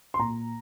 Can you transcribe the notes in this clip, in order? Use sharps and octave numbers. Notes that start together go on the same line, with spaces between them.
C6
A#2 A#5